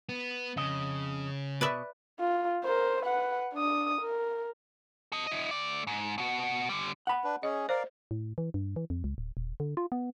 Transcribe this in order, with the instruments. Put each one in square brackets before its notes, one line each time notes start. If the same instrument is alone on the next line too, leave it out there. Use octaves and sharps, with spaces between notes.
[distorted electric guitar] B3
[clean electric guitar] F2 D#5 [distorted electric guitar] C#3
[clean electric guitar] B2 [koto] B4 D5 E5
[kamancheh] F4
A#4 C5
B4 F#5
D4 D#6
A#4
[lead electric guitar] A4 D#5
E4 D#5
A3 D5
G#2
B2 F#4
D3 G3
[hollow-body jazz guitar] F#5 B5
[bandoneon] D4 B4
[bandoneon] C#4 G#4 [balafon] D#5
[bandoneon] A#4 D5 F5 [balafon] C5
[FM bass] A2
E3
G2
E3
F2
C#2
D1
D#1
D3
F4
B3